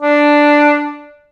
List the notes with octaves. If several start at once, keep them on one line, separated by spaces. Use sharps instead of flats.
D4